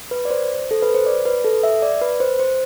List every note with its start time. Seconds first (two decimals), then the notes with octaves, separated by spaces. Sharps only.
0.11 B4
0.25 D5
0.31 C5
0.71 A4
0.82 B4
0.94 C5
1.06 D5
1.25 B4
1.44 A4
1.63 E5
1.82 D5
2.01 B4
2.20 C5
2.39 C5